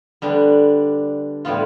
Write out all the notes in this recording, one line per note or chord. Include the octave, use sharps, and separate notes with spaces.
D3 G3 B3 D4
A2 G3 B3 F4